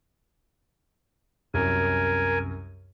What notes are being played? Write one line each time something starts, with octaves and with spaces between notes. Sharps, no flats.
C2 F#2 A#4 G#5